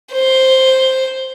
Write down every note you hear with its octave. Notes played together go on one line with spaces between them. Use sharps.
C5